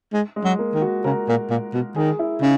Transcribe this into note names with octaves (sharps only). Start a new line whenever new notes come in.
G#3
G#3
F#3
A#3
D#3
F#4
C#3 A#4
A#2
A#2
B2
D#3 G#4
E4
C#3 D#4